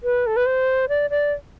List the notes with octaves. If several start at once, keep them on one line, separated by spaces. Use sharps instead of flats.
B4
A4
B4
C5
D5
D5